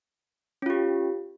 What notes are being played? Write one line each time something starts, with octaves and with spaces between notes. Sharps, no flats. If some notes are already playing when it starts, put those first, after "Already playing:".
C#4 F4 G4